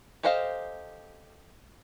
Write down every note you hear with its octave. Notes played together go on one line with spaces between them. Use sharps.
G4 A4 C5 D#5 F5